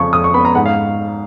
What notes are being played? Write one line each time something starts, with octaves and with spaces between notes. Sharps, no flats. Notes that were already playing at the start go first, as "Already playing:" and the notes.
Already playing: F2 C#3 C#6
F2 D#6
C#6
B3 B5
A#5
G#2 F#5
F5